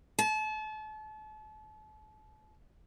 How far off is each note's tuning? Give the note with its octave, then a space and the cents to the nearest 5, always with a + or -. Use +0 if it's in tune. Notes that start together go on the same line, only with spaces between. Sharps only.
A5 -35